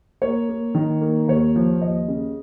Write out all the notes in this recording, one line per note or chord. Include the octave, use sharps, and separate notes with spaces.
A#3 C#5
A#3
D#3
A#3
D#2 C#5
F3
D#2 D#5
C#3